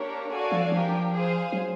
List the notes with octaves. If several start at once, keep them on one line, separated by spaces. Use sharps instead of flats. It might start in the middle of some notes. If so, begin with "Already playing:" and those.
Already playing: A#3 D4 G4 A#4 C#5
F#4 A4 D5 F5 G#5
F3
F3 D4 G4 A#4
G#4 C5 F5 G#5
F#3